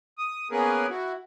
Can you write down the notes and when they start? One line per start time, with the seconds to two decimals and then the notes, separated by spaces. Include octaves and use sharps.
0.18 D#6
0.51 A#3 B3 C#4 G#4 A#4 B4
0.89 E4 F#4